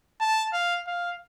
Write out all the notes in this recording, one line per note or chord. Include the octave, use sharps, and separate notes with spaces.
A5
F5
F5